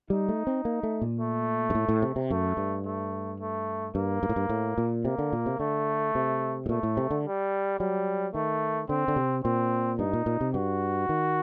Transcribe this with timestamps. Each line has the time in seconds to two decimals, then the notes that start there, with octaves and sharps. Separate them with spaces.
0.10 G3 D#4
0.29 A3
0.47 C4
0.65 A#3
0.83 A3
1.02 A#2
1.20 A3
1.70 G2
1.75 A2
1.89 A2
2.02 C3
2.16 C3
2.30 F#2 A3
2.57 G2
2.85 A3
3.40 A3
3.94 G2 A#3
4.23 G2
4.29 A2
4.36 G2
4.49 A2
4.78 A#2
5.05 C3 A#3
5.19 D3
5.33 A#2
5.46 C3
5.59 D3 A3
6.15 C3
6.66 A2
6.69 A#2 A3
6.83 A2
6.97 C3
7.11 D3
7.25 G3
7.79 F#3 G3
8.34 D#3 A3
8.89 D3 C4
9.08 D3
9.16 C3
9.44 A#2 C4
9.99 G2 D#4
10.13 A#2
10.26 A#2
10.41 C3
10.54 G2 F#4
11.09 D#3